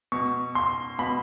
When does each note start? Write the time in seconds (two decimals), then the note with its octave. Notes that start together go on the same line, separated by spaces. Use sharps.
0.12 B2 C#6
0.55 C6
0.99 B2 B5